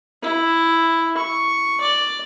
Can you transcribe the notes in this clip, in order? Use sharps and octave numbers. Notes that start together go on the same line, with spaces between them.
E4
C#6
D5